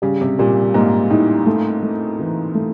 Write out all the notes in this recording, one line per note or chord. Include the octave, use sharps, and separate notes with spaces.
C#3 G3
C3
A#2 G3
G#2 A#3
A2 D#4
A3
A3
E3
A3